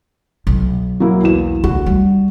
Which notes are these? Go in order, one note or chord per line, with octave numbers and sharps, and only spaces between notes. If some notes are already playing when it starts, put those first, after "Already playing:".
B1
F#3 A#3 E4
E2 E7
D2 F#4
G3